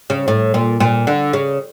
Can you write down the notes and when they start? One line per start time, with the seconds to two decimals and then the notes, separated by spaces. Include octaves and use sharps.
0.10 C#3
0.28 A2
0.54 A#2
0.80 A#2
1.07 D3
1.33 C#3